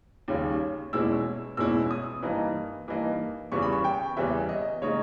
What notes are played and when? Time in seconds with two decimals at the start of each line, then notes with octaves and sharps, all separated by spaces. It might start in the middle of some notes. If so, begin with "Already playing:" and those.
0.28 D#2 C#3 G3 C#4
0.93 E2 B2 G#3 C#4 E4 E6
1.57 E2 B2 G#3 C#4 E4 E6
1.91 D#6
2.22 G2 E3 A#3 D#4
2.88 G2 E3 A#3 D#4
3.52 E2 C#3 E3 G3 C#4 C#6
3.62 B5
3.73 C#6
3.84 G5
4.17 E2 C#3 E3 G3 C#4 E5
4.49 D#5
4.82 C#3 G#3 D#4 C#5